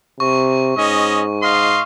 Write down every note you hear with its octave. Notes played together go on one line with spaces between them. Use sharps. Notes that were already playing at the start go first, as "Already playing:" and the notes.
C3 C#6
G#2 C#4 D#5
D#5 F5 C6